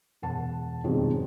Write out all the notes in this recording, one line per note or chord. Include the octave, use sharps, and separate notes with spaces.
E1 F#5 A5
F2 G#2 B2 D#3 G3 C#4